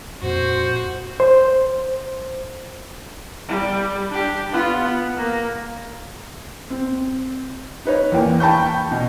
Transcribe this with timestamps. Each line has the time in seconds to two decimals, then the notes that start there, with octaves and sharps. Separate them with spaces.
0.22 F2 A#2 F#4 C5
1.20 C5
3.48 G3
4.10 D4 G4
4.52 B3 F4
4.83 B3
5.16 A#3
6.70 C4
7.85 D#4 B4 C#5
8.12 E2 E3 A#3 G5
8.40 G5 A5 B5 C#6 G6
8.91 B2